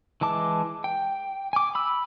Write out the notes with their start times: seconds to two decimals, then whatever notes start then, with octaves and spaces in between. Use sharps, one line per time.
0.21 E3 G#3 A5 D6
0.84 G5
1.53 G#5 D6
1.75 B5 E6